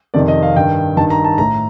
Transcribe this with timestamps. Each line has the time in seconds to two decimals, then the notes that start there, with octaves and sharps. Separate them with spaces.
0.14 F2 C3 D#3 D5
0.28 D#5
0.42 F5
0.56 G2 D#3 G5
0.97 G2 D#3 A5
1.10 A#5
1.24 A5
1.38 A2 A#5